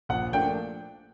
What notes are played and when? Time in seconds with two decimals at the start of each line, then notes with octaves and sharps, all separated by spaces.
0.09 A#1 F#5
0.33 A#2 F3 A3 D4 G5